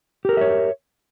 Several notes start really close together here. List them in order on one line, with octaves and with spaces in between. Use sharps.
G4 A#4 A4 E5 C#5